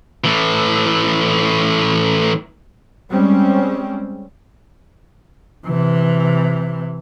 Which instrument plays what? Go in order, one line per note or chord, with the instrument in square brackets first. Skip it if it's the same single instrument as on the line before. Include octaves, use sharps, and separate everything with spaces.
[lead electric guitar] A2 E3
[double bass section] G3 G#3 C4 C#4
[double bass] C3 E3